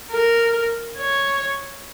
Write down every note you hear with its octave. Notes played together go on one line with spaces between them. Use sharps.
A#4
C#5